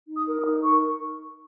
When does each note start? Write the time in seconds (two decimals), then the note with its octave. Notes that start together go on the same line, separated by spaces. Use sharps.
0.08 D#4
0.15 D#6
0.27 A#4
0.40 D#6
0.45 D#4
0.63 A#4 C#6